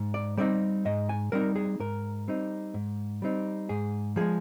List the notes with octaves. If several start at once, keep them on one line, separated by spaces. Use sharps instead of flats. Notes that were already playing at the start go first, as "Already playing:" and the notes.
Already playing: G#2
D5
G3 C4 D#4 D5
G#2 D#5
G#5
G3 C4 D#4 A#4
G#4
G#2 A#4
G3 C4 D#4
G#2
G3 C4 D#4
G#2 G#4
F3 G#3 G#4